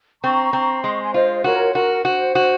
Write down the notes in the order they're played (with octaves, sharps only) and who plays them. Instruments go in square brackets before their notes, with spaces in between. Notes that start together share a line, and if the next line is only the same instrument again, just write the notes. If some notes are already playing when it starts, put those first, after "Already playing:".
[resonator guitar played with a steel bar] C4 [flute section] A#5 C#6
[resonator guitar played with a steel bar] C4
[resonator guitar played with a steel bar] G#3 [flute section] C6
[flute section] C#6
G#5 C6
[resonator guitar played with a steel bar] F4 [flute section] C5 D#5
[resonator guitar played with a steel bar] F#4 [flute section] A#4 C#5
[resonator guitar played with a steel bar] F#4 [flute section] A#4
[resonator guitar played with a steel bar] F#4 [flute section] C5
[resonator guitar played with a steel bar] F#4